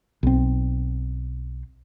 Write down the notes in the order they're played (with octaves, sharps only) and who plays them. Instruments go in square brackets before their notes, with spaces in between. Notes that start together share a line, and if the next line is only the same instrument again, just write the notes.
[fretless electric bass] B1 C4